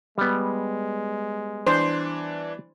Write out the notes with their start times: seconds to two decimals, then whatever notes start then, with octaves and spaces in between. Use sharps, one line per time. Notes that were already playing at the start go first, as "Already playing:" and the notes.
0.18 G3 G#3 B3
1.67 E3 D4 C5